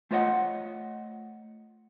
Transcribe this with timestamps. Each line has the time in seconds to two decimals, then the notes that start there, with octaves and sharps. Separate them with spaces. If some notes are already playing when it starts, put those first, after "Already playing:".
0.11 A3 F4 C5 C#5 D#5 F#5